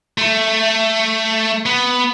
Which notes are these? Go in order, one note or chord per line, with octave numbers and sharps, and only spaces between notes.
A3
B3